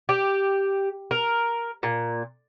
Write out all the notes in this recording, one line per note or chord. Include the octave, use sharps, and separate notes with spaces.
G4
A#4
A#2